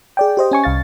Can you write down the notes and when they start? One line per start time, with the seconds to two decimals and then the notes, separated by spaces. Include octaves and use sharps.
0.17 G#4 D5 G5
0.37 G4 C5 D#5
0.51 C#4 G#5 C#6
0.64 C2 F5 A6